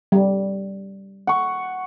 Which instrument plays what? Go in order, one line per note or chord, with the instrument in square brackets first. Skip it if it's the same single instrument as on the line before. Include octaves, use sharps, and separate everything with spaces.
[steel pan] G3
[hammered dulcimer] F#5 C#6